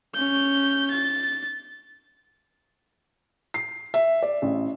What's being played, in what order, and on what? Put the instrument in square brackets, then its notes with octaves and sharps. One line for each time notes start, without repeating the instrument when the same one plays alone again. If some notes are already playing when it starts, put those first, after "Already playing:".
[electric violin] C#4 G6
A6
[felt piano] C7
E5
D5
A1